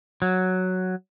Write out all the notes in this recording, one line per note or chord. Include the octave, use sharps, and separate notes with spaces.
F#3